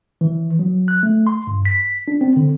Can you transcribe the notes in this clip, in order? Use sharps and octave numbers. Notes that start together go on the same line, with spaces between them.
E3
F#3
F#6
A3
C6
G2
B6
D4
C4
D3